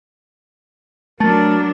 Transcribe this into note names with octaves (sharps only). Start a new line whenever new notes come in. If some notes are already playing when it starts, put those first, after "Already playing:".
F#3 A3 D4 A#4 A5 A6